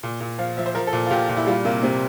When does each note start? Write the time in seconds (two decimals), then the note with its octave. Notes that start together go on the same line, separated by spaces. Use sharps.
0.03 A#2
0.20 A#2
0.38 F3 F5
0.57 F3 E5
0.66 C5
0.75 F3 A#4
0.87 A4
0.93 A#2
1.07 F4
1.11 A#2 G4
1.29 A#2
1.37 E4
1.47 G3 F4
1.65 C3 A#3
1.83 C3 C4